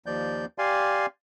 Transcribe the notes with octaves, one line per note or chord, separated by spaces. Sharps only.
D#2 F3 D5 G6
G4 D5 F5 G#5 C6